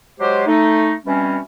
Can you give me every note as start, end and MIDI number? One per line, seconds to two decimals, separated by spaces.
0.19 0.43 54
0.19 0.43 56
0.19 0.43 67
0.19 0.43 72
0.46 0.92 57
0.46 0.92 63
1.05 1.38 47
1.05 1.38 52
1.05 1.38 55
1.05 1.38 60
1.05 1.38 61